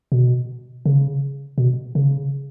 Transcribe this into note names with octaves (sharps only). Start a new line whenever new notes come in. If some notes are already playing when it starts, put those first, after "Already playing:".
B2
C#3
B2
C#3